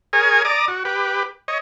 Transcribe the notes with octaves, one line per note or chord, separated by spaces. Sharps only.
G#4 A#4 C#5 G#5
D5 A#5 D6 D#6
F#4
G4 B4
C#5 D#5